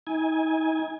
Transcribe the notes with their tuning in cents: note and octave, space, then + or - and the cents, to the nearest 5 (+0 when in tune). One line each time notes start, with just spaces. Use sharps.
D#4 +40 G#5 -10